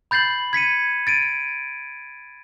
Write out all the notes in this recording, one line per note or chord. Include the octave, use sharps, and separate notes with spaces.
B5 G6 A6 C7 F#7
G#6 B6 C#7 D#7
A6 D7 D#7